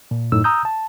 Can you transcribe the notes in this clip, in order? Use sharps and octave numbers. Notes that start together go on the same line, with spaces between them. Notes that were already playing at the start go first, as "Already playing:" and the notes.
A#2
F#2 A2 A3 D#4 E6
A#5 D#6 E6 G6
A5